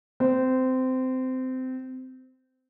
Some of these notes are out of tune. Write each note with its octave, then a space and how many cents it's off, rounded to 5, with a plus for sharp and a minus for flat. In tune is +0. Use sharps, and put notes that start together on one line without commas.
C4 -20